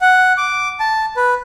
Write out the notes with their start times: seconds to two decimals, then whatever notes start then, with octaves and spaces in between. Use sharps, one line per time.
0.01 F#5
0.37 D6
0.80 A5
1.17 B4